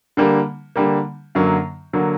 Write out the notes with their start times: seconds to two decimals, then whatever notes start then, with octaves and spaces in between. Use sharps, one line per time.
0.17 D3 G3 A#3
0.76 D3 G3 A#3
1.35 F#2 D3 F#3 A#3
1.93 D3 F#3 A#3